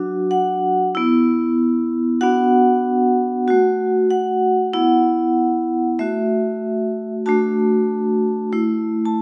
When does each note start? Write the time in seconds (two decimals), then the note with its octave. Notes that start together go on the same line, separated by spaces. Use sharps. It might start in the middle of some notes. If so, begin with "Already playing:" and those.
Already playing: F#3 D4 F#4
0.31 F#5
0.95 B3 E4
2.21 B3 D4 F#4 F#5
3.48 A3 F#4
4.11 F#5
4.73 B3 E4 F#5
5.99 A3 F#4 E5
7.26 A3 D4 F#4 A5
8.52 A3 E4
9.05 A5